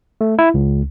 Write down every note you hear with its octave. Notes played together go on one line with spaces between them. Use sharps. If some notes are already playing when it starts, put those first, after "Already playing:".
A3
E4
C#2